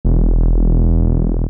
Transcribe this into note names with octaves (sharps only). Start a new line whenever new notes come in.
E1